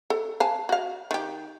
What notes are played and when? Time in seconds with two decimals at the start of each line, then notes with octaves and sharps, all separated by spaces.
0.10 A4
0.40 F5 G#5 A5
0.69 F#4 F5
1.11 D#3 G4